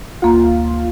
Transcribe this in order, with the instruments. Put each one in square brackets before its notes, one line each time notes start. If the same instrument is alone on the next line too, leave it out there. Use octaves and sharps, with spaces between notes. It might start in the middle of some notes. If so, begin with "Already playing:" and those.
[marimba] D2 A#3 A#5 [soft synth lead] F4